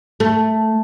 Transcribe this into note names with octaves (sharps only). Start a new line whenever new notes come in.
A3